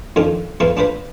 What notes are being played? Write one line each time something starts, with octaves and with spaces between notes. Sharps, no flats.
F2 D#3 D4 F4
E2 F3 E4 F4 B4 C6
D4 F4 B4 C5 B5